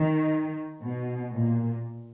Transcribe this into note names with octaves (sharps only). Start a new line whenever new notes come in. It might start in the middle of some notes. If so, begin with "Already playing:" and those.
Already playing: D#3
B2
A#2